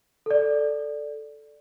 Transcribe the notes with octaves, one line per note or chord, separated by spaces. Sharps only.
A4 D5